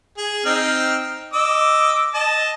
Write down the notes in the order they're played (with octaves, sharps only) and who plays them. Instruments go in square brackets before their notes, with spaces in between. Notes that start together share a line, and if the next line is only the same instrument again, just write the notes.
[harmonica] G#4
C4 D#4 F6
D#5 D6 E6
D#5 A5